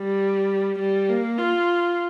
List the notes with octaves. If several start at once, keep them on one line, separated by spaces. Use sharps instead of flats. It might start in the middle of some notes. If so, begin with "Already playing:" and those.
Already playing: G3
G3
A#3
F4